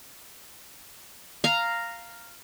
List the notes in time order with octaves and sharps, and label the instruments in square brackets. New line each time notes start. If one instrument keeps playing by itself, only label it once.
[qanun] F5 A#5